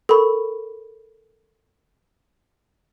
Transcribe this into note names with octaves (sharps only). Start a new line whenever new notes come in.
A4 A#4 B5 C#6